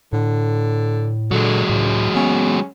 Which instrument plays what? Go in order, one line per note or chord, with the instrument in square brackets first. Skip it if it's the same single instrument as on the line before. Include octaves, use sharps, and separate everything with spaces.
[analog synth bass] A2 [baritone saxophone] D3
[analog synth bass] A#2 [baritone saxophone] D3 [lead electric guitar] F#3 G#3
[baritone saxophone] C#2 [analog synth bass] A2
[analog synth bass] B3 [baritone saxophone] C#4